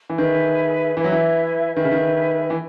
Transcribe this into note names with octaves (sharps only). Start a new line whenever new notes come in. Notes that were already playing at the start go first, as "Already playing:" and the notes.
E3
D#3 G#4 B4 E5
E3 E4 B4 E5
F#3
E3
D#3 G#4 B4 E5
C#3
D#3
E3